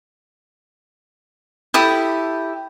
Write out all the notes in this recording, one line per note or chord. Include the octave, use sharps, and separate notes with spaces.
E4 G4 A4 D#6